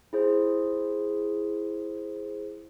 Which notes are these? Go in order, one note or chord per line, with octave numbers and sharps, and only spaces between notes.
E4 G#4 C5